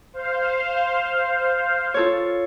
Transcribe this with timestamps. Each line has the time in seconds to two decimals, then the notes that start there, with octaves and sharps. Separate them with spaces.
0.13 C5 F5
1.94 F4 A4 C#5